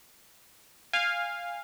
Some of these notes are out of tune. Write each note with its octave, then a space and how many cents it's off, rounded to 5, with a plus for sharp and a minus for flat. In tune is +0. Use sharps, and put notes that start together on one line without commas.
F5 +0 G#5 -25